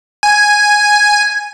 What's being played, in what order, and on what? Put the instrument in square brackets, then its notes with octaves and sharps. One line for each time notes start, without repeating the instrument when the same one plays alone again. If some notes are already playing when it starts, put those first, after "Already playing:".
[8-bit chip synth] G#5